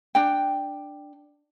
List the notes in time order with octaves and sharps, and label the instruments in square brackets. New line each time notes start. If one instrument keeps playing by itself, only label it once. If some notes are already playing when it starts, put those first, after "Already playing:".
[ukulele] D4 G5